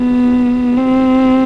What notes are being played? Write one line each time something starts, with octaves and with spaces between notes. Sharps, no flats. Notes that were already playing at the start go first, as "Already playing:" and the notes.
Already playing: B3
C4